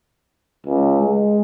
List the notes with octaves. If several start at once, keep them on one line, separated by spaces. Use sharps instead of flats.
C#2
G#3